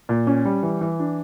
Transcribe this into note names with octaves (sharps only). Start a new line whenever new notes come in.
A#2
C#4
G3
E3
E3
D4